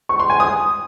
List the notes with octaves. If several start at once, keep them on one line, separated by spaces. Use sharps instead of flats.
C#6
C6
G#5
D#6